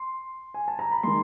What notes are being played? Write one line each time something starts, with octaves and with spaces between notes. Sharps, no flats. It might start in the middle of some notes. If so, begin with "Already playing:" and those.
Already playing: C6
G#5
A5
A#5
B5
D#3 G#3 C6